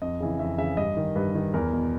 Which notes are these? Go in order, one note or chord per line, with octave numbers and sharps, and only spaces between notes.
F2 D#5
C#3 E3
F2 E5
C#3 E3 E5
G2 D#5
D#3
G2 B4
D#3
E2 A#4
B2